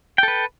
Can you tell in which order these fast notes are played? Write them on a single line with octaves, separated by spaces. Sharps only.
G5 A4 B4